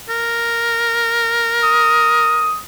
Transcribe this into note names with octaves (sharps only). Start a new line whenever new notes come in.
A#4
D#6